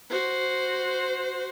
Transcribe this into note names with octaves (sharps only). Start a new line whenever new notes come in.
F#4 C5